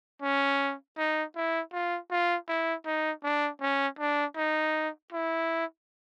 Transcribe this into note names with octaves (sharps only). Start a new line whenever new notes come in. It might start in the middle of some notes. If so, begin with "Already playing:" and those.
C#4
D#4
E4
F4
F4
E4
D#4
D4
C#4
D4
D#4
E4